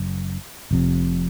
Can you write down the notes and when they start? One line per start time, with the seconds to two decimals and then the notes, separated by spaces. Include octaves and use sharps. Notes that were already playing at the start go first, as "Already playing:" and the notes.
Already playing: F#1 F#2
0.71 F1 F2 C3